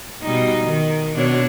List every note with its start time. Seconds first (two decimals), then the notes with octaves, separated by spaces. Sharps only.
0.22 B2 G3 D#4
0.64 D#3
1.16 B2 D4 C#5